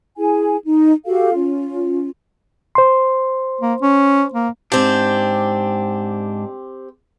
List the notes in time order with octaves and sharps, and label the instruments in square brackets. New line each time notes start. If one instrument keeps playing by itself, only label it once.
[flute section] E4 G#4 G#5
D#4
F#4 G4 A4 F5
C#4 F4
[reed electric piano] C5 C6
[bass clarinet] A#3
C#4
A#3
[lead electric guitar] G#2 D4 [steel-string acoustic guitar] C4 G4